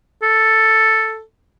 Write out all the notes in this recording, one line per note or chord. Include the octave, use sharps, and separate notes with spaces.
A4